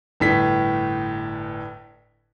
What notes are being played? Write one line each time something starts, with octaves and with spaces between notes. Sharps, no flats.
G1 A2 B6